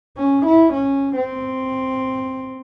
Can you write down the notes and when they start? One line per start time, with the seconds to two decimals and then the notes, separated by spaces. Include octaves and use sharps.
0.18 C#4
0.46 E4
0.73 C#4
1.16 C4